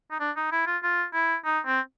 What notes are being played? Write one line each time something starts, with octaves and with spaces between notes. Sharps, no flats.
D#4
D4
D#4
E4
F4
F4
E4
D#4
C4